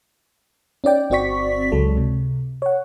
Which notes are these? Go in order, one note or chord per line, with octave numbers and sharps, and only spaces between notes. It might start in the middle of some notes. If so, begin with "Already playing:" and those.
C#4 D#4 D5 G5
G1 C4 F#4 D5 C#6 B6
C#2 F#3 G#3 A4
C3
C#5 F#5